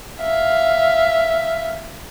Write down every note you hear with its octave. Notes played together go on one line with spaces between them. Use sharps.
E5 F5